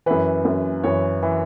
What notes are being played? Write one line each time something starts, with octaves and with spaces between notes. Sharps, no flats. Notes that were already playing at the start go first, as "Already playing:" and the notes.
F#2 E3 B4
F#2 E3
F#2 E3 C#5
E3